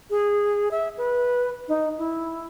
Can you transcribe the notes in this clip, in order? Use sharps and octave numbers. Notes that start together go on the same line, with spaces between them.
G#4
E5
B4
D#4
E4